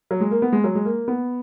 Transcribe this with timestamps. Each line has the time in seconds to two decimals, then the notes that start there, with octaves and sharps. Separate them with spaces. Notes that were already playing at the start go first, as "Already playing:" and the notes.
0.11 F#3
0.21 G#3
0.31 A#3
0.42 B3
0.53 G#3
0.64 F#3
0.75 G#3
0.85 A#3
1.08 B3